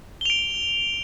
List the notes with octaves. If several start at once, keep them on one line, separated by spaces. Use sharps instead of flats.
D7 F7 G7